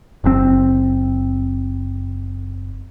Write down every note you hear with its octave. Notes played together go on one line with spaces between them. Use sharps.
F#1 A2 C4